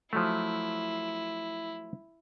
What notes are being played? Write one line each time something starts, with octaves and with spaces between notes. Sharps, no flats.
F3 F#3 A3 E4